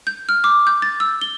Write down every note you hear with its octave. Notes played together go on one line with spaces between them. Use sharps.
G6
F6
D6
G6
A6
E6
G7